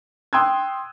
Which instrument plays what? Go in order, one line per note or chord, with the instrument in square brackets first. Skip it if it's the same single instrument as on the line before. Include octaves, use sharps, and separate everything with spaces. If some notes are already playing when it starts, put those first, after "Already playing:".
[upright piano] G5 C6 D#6 E6 F#6 G#6